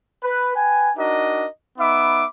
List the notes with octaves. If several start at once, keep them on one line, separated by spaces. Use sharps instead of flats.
B4
B4 G5 G#5
D4 D#4 F#4 A#4 D#5
B3 D#4 E5 B5 D6